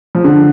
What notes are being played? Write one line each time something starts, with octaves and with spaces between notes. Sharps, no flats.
F3
D3